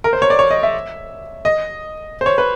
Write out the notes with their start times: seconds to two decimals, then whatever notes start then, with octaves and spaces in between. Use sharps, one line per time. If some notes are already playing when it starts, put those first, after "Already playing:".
0.04 A#4
0.13 C5
0.22 C#5
0.30 D5
0.39 C#5
0.51 D#5
0.63 E5
1.45 D#5
2.21 C5
2.26 C#5
2.38 B4